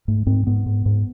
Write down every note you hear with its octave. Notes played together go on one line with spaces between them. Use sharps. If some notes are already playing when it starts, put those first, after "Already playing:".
G#2 A3
G#2 C4
G#2 B3
G#2
G#2